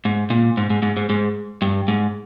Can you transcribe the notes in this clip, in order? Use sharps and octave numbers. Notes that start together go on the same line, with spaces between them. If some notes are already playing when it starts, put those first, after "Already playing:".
G#2
A#2
G#2
G#2
G#2
G#2
G#2
G2
G#2